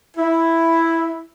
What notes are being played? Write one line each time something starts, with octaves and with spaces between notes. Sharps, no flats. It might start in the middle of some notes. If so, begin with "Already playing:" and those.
E4